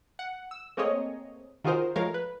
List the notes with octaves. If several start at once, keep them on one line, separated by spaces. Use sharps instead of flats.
F#5
E6
A3 A#3 C4 G#4 C#5 D#5
D#3 F4 F#4 G#4 A#4 C5
F3 G#3 A3 A#4 C#5 F5
B4